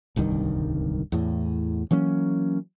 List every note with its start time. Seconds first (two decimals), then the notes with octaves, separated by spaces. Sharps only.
0.16 D1 C2 G2 D#3
1.12 E2 A2
1.91 E3 F#3 A#3 C#4